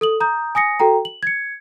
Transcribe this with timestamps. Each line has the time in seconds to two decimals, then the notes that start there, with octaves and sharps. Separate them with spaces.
0.01 A4 D#6 F#7
0.20 A#5 D#6 G6
0.55 G#5 D#6 A#6 C#7
0.80 F#4 A4 G5 A#5
1.05 F#7
1.23 G#6 C#7